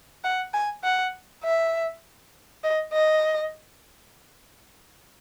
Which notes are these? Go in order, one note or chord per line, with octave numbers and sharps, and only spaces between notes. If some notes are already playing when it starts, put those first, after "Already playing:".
F#5
G#5
F#5
E5
D#5
D#5